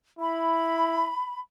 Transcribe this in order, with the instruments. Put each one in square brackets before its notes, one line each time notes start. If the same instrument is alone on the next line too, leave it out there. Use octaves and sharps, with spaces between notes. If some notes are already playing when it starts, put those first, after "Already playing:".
[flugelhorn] E4 [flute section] B5